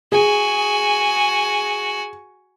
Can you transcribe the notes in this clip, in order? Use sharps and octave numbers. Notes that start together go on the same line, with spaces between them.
F#4 G#4 G#5